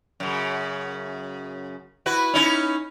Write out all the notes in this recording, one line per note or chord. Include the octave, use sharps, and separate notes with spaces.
F#2 C#3
E4 F#4 B4
C#4 D#4 E4